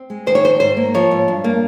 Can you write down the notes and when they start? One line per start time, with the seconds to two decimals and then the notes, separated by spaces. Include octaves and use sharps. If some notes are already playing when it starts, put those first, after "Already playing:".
Already playing: C4
0.10 G#3
0.27 D#3 C5
0.35 C#5
0.43 F2 C5
0.60 G#2 C5
0.77 A#3
0.94 F3 C#5
1.11 G#2
1.28 G2
1.44 A#3